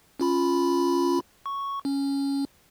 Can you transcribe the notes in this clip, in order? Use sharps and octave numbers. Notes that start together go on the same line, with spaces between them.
C#4 F4 B5
C#6
C#4